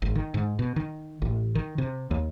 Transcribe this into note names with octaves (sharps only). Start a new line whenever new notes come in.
G#1
D#3
G#2
B2
D#3
A1
D#3
C3
D#2